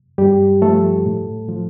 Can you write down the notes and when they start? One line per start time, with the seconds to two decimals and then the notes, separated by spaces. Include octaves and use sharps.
0.18 G2 G3 G4
0.62 F3 A3 A4
1.06 A2
1.49 F3